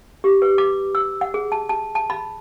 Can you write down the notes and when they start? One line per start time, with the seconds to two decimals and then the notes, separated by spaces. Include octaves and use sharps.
0.24 G4
0.42 B4
0.58 D6
0.95 E6
1.21 F#5
1.34 G#4
1.52 A5
1.69 A5
1.95 A5
2.10 B5